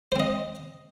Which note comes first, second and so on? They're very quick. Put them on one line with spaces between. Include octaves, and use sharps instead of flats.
C5 C4 D#5